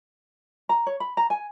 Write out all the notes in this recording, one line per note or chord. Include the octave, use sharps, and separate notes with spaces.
A#5
C#5
B5
A#5
G#5